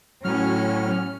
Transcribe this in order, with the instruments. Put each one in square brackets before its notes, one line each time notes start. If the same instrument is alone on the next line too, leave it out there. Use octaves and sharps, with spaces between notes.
[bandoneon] A2 F6 [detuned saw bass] F#3 [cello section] C#4